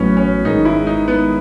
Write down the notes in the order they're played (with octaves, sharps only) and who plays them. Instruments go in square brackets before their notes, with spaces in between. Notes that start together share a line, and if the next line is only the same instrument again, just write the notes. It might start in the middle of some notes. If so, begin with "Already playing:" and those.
Already playing: [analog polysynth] A1 A2 F#3 [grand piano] B3 C#4
[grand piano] C#4
[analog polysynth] G#1 G#2 D#3 G#3 [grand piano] D#4
[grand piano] E4
D#4
B3